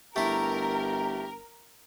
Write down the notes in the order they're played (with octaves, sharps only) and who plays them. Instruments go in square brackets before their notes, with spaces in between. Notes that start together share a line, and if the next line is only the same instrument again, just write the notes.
[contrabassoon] G1 [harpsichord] A3 E4 [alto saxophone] G4 [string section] A#4